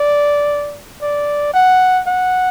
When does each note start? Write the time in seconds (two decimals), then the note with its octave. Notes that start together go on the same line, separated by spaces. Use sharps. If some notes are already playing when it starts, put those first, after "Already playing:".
Already playing: D5
1.02 D5
1.54 F#5
2.07 F#5